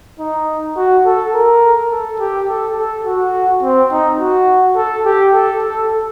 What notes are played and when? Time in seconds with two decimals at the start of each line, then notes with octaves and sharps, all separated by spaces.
0.19 D#4
0.77 F#4
1.06 A4
1.34 A#4
1.91 A4
2.20 G4
2.48 A4
2.77 A4
3.06 F#4
3.63 C4
3.92 D#4
4.20 F#4
4.77 A4
5.05 G4
5.34 A4
5.62 A4